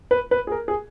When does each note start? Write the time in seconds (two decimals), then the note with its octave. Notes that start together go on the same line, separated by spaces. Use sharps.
0.11 B4
0.31 B4
0.47 G#4
0.52 A#4
0.68 G#4